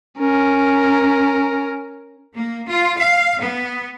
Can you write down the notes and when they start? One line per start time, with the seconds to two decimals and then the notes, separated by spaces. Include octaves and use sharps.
0.19 C#4 A#4
2.34 A#3
2.67 F4
2.98 F5
3.41 B3